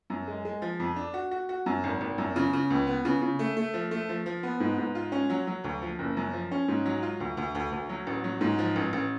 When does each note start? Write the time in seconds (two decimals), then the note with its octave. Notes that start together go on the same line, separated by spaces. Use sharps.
0.10 F#2
0.28 G#3
0.45 G#3
0.62 F3
0.80 F2
0.96 D4
1.14 F#4
1.31 F#4
1.49 F#4
1.66 F#2
1.84 G#1
2.01 G#1
2.18 F#2
2.36 C#3
2.53 C#3
2.70 C#2
2.87 B3
3.05 C#3
3.22 C#3
3.39 A3
3.57 A3
3.74 F3
3.91 A3
4.09 F3
4.26 F3
4.43 B3
4.60 G#2
4.78 G#2
4.95 F4
5.12 C#4
5.30 F#3
5.47 F#3
5.64 D2
5.82 F3
5.99 F#1
6.17 F#2
6.33 F3
6.51 C#4
6.68 G#2
6.86 F#3
7.03 F4
7.20 D2
7.37 D2
7.55 D2
7.72 D2
7.89 F#3
8.07 A1
8.24 F#3
8.41 G#2
8.58 F3
8.76 A1
8.93 A1